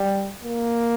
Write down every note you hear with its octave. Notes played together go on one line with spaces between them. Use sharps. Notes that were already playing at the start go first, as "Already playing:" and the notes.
Already playing: G3
A#3